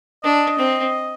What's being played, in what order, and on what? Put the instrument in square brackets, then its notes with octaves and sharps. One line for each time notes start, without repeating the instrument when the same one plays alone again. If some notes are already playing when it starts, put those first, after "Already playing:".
[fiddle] D4 [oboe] D#5
[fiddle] C4